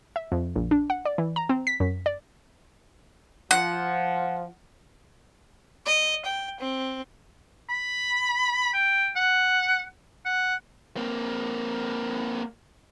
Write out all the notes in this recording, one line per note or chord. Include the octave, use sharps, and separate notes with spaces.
E5
F2
A#1
D4
F#5
D5
E3
A#5
C4
B6
F#2
D5
F3 F#5
D#5
G5
C4
B5
G5
F#5
F#5
A#3 C4